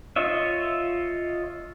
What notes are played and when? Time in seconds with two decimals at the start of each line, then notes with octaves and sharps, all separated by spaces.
0.16 F4 C#5 D#5 E5